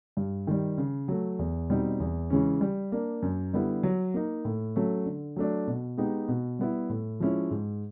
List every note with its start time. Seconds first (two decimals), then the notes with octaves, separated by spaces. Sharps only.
0.17 G2
0.47 D#3 G3
0.78 C#3
1.08 F#3 A3
1.39 E2
1.70 B2 G3 C4 D#4
2.00 E2
2.30 C#3 E3 G#3 C#4
2.61 G3
2.92 A#3 D4
3.22 F#2
3.53 D3 G3 B3 E4
3.83 F#3
4.14 A#3 D#4
4.45 A2
4.75 F#3 A3 C#4
5.06 D3
5.36 F#3 A3 D4
5.67 B2
5.97 G#3 B3 D#4 G4
6.28 B2
6.59 G3 B3 E4
6.90 A2
7.20 F3 G#3 C#4 E4
7.51 G#2